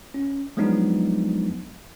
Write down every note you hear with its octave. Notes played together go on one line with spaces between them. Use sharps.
C#4
F3 F#3 G#3 B3 D4 D#4